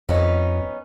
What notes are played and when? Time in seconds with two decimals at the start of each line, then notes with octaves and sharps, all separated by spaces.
0.09 F2 B3 C#4 D#4